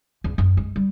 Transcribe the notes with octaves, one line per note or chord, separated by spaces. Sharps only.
E2
F#2
G#3
G3